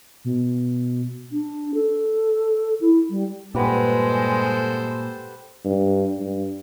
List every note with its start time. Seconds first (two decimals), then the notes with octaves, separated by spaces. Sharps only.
0.25 B2
1.32 D4
1.74 A4
2.81 E4
3.10 G3
3.55 G2 A#2 G#3 G4 A4 B4 C5 F#5
5.65 G2
6.19 G2